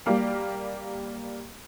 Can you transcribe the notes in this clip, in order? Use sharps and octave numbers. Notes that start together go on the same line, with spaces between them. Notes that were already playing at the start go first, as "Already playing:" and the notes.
G3 A#3 F5